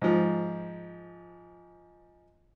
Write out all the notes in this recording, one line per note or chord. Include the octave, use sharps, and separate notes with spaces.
G#2 F3